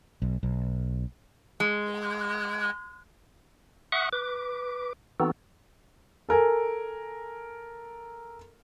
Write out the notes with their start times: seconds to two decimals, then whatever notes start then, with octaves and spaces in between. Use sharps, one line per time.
0.22 B1
0.43 B1
1.60 G#3
3.92 E5 F#5 C#6 D#6 F#6
4.13 B4 D6
5.20 E3 B3 C4 D#4 F#4 A4
6.29 A4 A#4 G#5